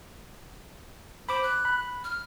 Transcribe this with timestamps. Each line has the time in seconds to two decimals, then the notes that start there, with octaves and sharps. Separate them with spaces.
1.29 C5 B5 D6
1.43 F#6
1.65 B5
2.04 F6